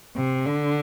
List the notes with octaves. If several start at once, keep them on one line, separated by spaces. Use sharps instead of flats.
C3
D3